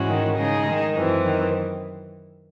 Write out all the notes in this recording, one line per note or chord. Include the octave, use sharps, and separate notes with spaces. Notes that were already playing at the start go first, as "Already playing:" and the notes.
Already playing: G#2 E3 G#3 C#4 F#4
D#3
C#3 G#3 D#4 G#4 D#5
D#3
F#2 E3 C4
D#3